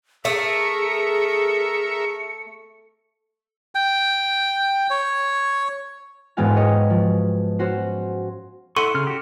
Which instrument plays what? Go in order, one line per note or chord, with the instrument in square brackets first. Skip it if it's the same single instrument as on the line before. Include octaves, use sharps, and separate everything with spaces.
[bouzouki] A3 [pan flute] G#4 [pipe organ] A#4 E5 [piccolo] C#7
[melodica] G5
C#5
[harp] E1 G#2 B3 F#4 F5 G#5
C#5 D#5
F3
C#4 F#4 C5
[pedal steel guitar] E4 F#5 C#6 [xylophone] A4 C6 D#7
[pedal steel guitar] C#3 F6
F#4 G4